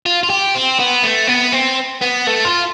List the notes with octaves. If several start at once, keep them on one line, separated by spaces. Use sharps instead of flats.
F4
F4
G4
C4
B3
A3
B3
C4
B3
A3
F4